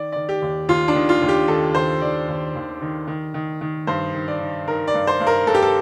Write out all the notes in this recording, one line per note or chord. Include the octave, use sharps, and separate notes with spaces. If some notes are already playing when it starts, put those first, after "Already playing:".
Already playing: D#3 D5
D#3 D5
G4
D#2
D#2 F4
D4
D#3
F4
D#2
G4
D#3 A4
D#2 C5
D#3 D5
D#2
D#2
D#3
D#3
D#3
D#3
G2 C5
D#3
D5
D#3
D#3 A#4
D5
G2
C5
G2
A#4
G2 A4
G4
A4